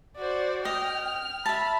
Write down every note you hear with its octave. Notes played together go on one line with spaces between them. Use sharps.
F#4 C5 D5
D#5 G5 F6
E5 A5 B5